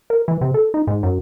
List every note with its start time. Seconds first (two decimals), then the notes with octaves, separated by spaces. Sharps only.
0.10 A#4
0.28 E3
0.41 C3
0.54 A4
0.74 D#4
0.87 G#2
1.03 F#2